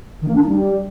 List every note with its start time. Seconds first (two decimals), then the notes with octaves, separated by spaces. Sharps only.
0.21 D#3
0.28 A#3
0.35 D4
0.41 D#4
0.48 G3